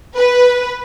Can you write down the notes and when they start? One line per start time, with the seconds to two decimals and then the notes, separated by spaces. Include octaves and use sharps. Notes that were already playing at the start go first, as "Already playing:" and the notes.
0.15 B4